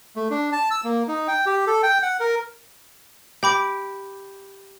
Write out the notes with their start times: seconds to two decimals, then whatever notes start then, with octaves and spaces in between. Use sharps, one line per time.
0.16 A3
0.30 D4
0.52 A5
0.71 E6
0.84 A#3
1.08 D#4
1.28 G5
1.46 G4
1.67 A4
1.83 G5
2.02 F#5
2.20 A#4
3.43 G4 G5 B5 D6